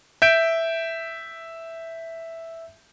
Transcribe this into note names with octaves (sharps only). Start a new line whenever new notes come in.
E5 G6 D7